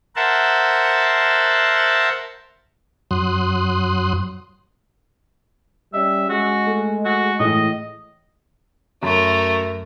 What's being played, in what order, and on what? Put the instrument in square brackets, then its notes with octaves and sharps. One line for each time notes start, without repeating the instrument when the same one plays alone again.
[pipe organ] A#4 C5 E5 F#5 A5
[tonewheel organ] F#2 F#3 C6 D#6 F#6
[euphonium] G3 [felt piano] C#4 D#5 [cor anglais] E5
[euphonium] G#3 [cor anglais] F#4
[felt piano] A3
[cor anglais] F#4
[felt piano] A2 E3 [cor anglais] D#5
[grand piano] F#2 [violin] A3 A#4